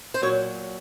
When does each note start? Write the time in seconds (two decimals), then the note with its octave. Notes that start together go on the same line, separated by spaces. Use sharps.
0.14 C5
0.22 A#2 F#3 C#5